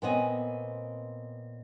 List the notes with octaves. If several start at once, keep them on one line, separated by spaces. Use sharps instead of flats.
A#2 B3 C4 C#5 D#5 G#5